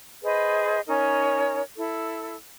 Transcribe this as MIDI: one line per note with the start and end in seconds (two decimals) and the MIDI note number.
0.23 0.80 68
0.23 0.80 71
0.23 0.80 72
0.23 0.80 75
0.87 1.60 61
0.87 1.60 63
0.87 1.60 70
0.87 1.60 73
1.76 2.35 64
1.76 2.35 69